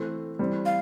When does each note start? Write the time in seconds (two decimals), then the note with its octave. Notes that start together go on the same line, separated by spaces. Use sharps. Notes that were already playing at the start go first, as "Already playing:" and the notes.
Already playing: E3 A3 C4
0.39 E3 G3 C4
0.65 F5